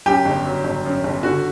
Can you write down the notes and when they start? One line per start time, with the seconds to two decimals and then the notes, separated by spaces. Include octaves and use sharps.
0.06 F#2 G4
0.25 G1
0.45 F#3
0.64 G1
0.85 F#2
1.04 G1
1.23 D3 F#4